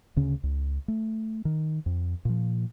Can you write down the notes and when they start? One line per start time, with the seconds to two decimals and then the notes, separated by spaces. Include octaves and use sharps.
0.16 D2 C#3 C#4
0.43 C#2
0.88 A3
1.45 D#3
1.86 F2
2.25 A#2 F3